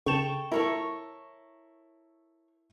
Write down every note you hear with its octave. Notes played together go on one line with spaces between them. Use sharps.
C#3 A4 G5 C#6 E7
E4 A4 A#4 C#5 C#6